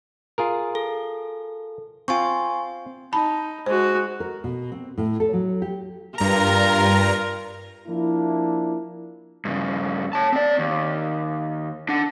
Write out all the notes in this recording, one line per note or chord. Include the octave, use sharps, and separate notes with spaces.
F4 G#4 A#4
A4
C4 F4 G#5 C6 C#6
D#4 A5 B5
G#3 F#4 C5
A#4
B2
C4
A2
A4
F#3
G4
G2 F4 A#4 A#5
F3 A#3 D4 E4
G2 C#3
C#5 A5
C4 D5
D#2
D4 F#5